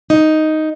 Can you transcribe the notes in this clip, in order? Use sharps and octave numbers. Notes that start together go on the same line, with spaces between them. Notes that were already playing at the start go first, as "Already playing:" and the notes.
D#4